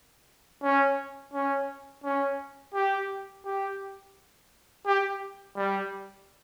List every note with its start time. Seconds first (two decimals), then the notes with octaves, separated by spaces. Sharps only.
0.63 C#4
1.34 C#4
2.04 C#4
2.74 G4
3.45 G4
4.86 G4
5.56 G3